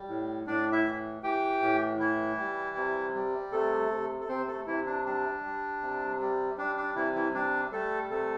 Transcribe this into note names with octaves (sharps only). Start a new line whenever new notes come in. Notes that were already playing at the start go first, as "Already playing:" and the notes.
Already playing: G3
A2
A2 D4 D5
E4 E5
E3
E3 G4 G5
A2
E3 E4
G3
C3
G3
C3 A3 A4
C3
A4
C3 C4 C5
A3 A4
C3 E3 E4
D4
G3 D4
G3
C3
G3
G3 D4
D4
C3 E3 E4
E3 E4
G3 D4
G3 A3 A4
C3 A3 A4